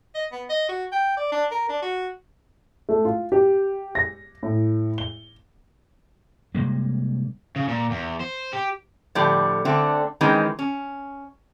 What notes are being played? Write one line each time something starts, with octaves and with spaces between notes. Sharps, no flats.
D#5
B3
D#5
F#4
G5
D5
D4
A#4
D4
F#4
A3
F4
G4
A#6
A2
G7
C3 G3 G#3 A#3
C#3
A#2
E2
C5
G4
A2 D3 F3 G3 D5
D3 A3 C4 D4
D#3 E3 G#3 C4 C#4
C#4